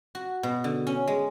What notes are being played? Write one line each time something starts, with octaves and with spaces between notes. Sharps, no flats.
F#4
B2
D3
C#4
G#3